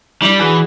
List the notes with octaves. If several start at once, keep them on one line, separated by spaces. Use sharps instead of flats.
G3 D4 E4
E3 F#4 G#4